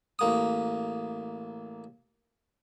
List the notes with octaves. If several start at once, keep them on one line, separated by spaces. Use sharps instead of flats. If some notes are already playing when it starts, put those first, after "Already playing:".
A1 A#3 D#6